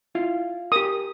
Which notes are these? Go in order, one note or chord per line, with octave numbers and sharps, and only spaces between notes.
E4 F4 F5
G4 A#4 D#6